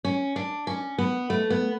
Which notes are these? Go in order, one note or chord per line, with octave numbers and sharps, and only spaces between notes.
C#4
D4
C#4
B3
A3
B3